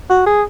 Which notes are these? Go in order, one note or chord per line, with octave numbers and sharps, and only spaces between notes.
F#4
G#4